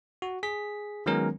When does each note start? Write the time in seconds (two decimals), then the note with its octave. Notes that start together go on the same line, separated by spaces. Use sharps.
0.22 F#4
0.43 G#4 B6
1.06 D#3 F#3 G#3 B3 C#4 A#4